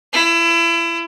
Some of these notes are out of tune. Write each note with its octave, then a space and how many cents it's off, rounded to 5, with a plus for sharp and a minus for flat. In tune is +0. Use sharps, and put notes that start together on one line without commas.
E4 +30